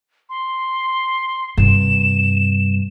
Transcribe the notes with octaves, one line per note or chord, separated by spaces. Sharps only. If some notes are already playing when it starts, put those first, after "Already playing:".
C6
G2 C3 E7